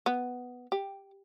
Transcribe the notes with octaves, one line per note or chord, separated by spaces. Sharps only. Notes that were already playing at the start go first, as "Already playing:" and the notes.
B3
G4